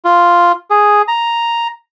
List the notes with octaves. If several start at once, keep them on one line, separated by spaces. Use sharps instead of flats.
F4
G#4
A#5